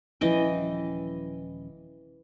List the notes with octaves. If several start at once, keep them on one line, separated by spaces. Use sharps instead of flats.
D#1 E3 F3 C#4 D#5 G5